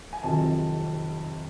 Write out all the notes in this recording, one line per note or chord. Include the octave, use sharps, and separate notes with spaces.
G#5
F1 F2 C3 D#3 F#3 A5